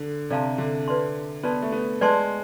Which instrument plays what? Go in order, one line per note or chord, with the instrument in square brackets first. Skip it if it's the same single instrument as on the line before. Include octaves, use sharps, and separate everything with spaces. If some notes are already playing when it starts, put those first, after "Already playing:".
Already playing: [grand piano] D3
[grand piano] C3 [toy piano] A4 D5 F5 A5 C6
[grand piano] D3
[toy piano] B4 D5 A5 C6
[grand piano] B3 [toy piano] B4 D5 A5 C6
[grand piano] A3
B3
[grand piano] G#3 [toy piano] B4 D5 A5 C6